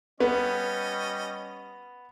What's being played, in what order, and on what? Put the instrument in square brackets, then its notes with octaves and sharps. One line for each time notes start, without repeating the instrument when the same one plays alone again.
[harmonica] G3 C#4 D#5 [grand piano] B3